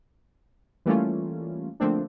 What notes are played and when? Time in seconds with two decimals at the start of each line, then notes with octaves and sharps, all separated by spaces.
0.86 E3 G3 A3 A#3 C#4 F4
1.80 D3 F3 A3 A#3 C4 D4